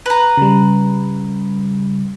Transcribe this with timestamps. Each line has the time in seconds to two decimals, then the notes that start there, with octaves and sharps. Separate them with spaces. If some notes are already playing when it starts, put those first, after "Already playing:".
0.06 B4 A#5
0.37 C#3 G3